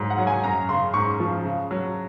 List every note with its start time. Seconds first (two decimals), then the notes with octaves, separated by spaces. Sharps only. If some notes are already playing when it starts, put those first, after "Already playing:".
Already playing: G#2 F#3
0.10 F#5
0.18 F#3
0.27 G#5
0.44 F#2 A#5
0.69 C#3 C6
0.94 G#2 C#6
1.20 F3
1.44 C#3
1.71 F#3